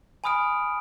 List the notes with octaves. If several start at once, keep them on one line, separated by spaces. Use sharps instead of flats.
G#5 B5 D#6 F6 D7